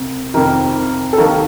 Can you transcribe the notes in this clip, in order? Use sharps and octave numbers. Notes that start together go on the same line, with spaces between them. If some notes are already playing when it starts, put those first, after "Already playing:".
Already playing: C2 C3
F2 C3 D#3 A#4
A4
D#2 D#3 A#4